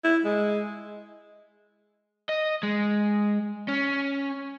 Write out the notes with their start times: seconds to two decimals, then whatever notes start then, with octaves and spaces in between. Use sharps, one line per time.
0.04 E4
0.25 G#3
2.29 D#5
2.63 G#3
3.68 C#4